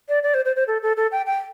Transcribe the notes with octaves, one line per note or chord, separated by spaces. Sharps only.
D5
D5
C5
C5
C5
A4
A4
A4
G5
G5